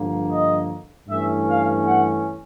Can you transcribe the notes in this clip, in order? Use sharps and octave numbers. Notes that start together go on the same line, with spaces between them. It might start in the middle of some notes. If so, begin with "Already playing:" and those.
Already playing: G2 D3 F3 A#3
D#5
G2 E3 A3 C#4 E5
F5
F#5